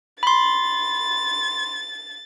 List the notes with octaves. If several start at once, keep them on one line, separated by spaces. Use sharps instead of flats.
B5 C6 A6